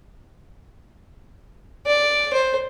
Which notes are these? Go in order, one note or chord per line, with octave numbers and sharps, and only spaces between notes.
D5
C5